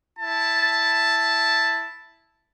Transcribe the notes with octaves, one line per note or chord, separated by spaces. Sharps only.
E4 A5